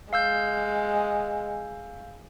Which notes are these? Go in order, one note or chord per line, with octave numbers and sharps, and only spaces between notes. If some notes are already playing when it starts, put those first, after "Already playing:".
G#3 F5 E6 G6